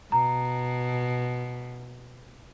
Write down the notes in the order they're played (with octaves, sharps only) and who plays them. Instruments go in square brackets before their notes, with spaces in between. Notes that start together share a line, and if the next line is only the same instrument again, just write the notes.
[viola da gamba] B2 [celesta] A#5